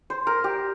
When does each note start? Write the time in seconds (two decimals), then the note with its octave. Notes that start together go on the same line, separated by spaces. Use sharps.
0.10 C5
0.27 A#4
0.44 G4